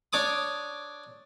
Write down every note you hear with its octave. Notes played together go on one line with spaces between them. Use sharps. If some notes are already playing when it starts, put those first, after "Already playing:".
D4 C#5 D6 D#6